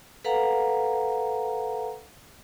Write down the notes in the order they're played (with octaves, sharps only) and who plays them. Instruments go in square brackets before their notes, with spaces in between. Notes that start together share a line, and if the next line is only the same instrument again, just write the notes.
[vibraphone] A4 B4 F5 F#5 A#5